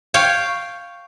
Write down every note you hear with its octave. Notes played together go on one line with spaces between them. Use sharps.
C#5 F5 G5